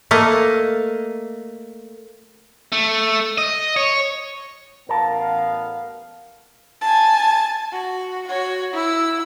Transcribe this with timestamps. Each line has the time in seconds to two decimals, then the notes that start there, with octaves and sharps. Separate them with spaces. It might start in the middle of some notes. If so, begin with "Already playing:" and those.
0.11 A3 A#3 D#5
2.72 A3
3.38 D#5
3.76 C#5
4.89 A1 B3 A#4 F5 A5
6.81 G#5 A5
7.72 F#4
8.27 F#4 C#5
8.74 E4 E6